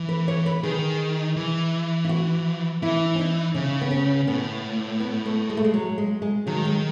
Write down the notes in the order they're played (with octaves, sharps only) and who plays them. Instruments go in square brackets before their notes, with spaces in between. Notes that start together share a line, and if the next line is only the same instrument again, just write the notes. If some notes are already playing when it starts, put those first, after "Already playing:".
Already playing: [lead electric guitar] E3
[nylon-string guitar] B4
C#5
B4
[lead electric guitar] D#3 [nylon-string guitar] G#4
[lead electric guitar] E3
[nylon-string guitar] E4
F#4
[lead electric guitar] E3 [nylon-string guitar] E4
[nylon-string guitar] C#4
D#4
[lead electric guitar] C#3 [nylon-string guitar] C#4
[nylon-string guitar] B3
C#4
[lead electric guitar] A2 [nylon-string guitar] B3
[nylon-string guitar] B3
A3
G#3
A3
G#3
F#3
G#3
G#3
[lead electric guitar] D#3 [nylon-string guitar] F#3
[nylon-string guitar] G#3